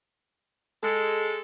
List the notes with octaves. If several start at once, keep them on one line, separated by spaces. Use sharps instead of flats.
G#3 A4